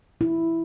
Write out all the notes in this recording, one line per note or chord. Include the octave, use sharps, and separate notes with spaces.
E4